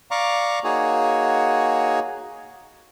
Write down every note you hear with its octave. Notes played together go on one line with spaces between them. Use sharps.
D5 F5 A#5 C#6 D6
A#3 D#4 F#4 G#4 C#5